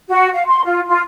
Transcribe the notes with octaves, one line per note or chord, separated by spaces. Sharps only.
F#4
F5
C6
F4
F4